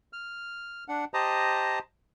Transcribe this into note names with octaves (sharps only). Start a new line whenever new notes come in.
F6
D4 F#5
G4 C5 D#5 A5 A#5 D#6